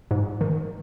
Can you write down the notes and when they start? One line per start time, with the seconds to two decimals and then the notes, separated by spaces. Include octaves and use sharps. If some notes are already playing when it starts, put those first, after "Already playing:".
0.11 G#2
0.41 D#3